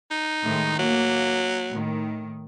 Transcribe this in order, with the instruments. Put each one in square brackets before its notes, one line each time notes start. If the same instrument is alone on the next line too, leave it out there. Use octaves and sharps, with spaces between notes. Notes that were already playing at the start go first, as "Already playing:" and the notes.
[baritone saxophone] D#4
[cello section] A2 D#3 G#3
[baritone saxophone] F#3 [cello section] A#3
[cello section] A2 D#3